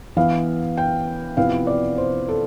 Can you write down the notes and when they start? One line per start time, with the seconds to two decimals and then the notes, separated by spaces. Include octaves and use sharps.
0.16 E3 B3 E4 F5
0.77 G5
1.37 C3 F3 B3 E4 F5
1.67 D5
1.98 C5
2.28 A4